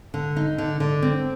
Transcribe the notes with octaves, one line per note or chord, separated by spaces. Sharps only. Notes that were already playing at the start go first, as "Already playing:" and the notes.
D3
D#4
D3
D3
C4